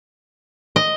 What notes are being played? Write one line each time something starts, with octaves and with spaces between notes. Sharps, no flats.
D#5